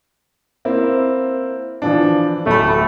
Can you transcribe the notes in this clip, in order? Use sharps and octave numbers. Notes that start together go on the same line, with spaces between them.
A#3 C4 E4
E3 F3 D4
D1 A3 B5